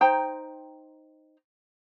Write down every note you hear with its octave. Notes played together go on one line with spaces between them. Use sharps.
D#4 C5 G5 A#5